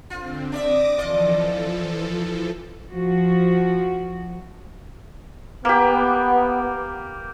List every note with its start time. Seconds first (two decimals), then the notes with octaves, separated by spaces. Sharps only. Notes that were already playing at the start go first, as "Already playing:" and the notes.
0.10 D3 C4 F4
0.52 D4 D5 E5 D6 D#6 A#6
0.98 E3 F3 F4 A4 D5 D#5
2.91 F3 F#4
5.65 A#3 B3 G4